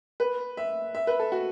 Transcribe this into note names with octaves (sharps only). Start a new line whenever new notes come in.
B4
E5
E5
B4
A4
F#4